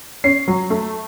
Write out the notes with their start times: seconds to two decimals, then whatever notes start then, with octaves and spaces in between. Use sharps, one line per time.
0.24 C#4 C7
0.48 F#3
0.70 A3